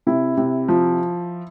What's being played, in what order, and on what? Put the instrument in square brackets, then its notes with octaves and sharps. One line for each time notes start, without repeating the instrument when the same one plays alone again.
[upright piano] C3 E4
C3
F3